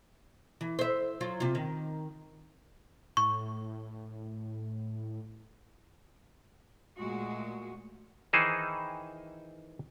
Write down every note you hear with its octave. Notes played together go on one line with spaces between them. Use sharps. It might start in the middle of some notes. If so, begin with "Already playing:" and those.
E3
C5 E5
F#3 F4
C3 F4
D#3
A2 C#6
A#2 G#3 A3 F#4
D#3 E3 D#4 G#4 C5